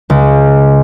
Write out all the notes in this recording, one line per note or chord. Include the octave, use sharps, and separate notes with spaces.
C#2